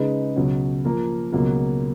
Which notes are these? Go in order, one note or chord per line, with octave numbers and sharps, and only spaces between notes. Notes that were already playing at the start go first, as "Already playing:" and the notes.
Already playing: C#3 G#3 D#4 G#4 B4
C#2 B2 F#3 C#4
F3 A#3 F4 A#4
C#2 B2 F#3 A#3